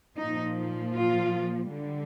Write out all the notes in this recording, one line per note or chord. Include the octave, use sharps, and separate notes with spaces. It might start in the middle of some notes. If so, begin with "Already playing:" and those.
A#2 F3 D#4
F4
D3 G3